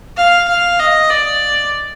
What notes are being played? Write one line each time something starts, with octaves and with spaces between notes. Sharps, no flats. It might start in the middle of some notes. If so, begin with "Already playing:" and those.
F5
F5
D#5
D5